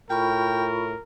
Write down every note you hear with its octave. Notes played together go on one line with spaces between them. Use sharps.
A2 F4 A#4 G5 B5 C#6